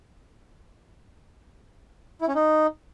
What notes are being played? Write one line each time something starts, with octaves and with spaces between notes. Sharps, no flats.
E4
C#4
D#4